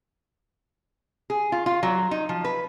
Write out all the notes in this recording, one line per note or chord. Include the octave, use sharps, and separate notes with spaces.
G#4
F4
F4
F#3
D#4
F3
B4